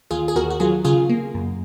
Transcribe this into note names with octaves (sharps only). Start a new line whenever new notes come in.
D#2 F4 G#4
G#4
D#2 F#4 A#4
F#4
F#3 F4 G#4
C#3 F4 G#4
A#3
F#2